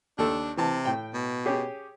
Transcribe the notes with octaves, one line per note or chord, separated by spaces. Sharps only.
D#2 D4 A4
C3 E3 A5
A2 G5
B2
C#4 G4 G#4